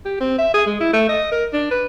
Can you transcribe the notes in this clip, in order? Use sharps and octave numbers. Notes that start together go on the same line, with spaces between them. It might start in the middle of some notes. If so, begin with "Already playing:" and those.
G4
C4
E5
G#4
G#3
E4
A3
D#5
A#4
D4
B4